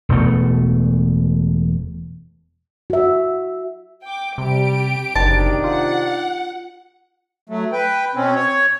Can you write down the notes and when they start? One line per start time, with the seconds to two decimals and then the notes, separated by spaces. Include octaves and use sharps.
0.09 E1 B2 A3
2.90 F#4 E5
4.04 G5 D6
4.38 C3 G3 G4 D7
5.15 F#1 C3 D#3 D4 A5
5.64 F4 F#5
7.50 F#3 A3
7.72 B4 G5
8.15 B2 C4 C#4
8.36 C#5